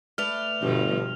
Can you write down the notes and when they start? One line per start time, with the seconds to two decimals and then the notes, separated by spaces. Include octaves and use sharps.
0.18 A3 B4 D5 F6 F7
0.61 G1 G2 B2 F3